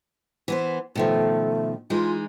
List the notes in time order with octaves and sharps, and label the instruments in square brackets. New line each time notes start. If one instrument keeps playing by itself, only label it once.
[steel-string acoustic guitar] E3 B3 C5
[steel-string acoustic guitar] B2 D#3 F3 [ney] A3
[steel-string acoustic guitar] E3 G#3 D#4 [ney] F4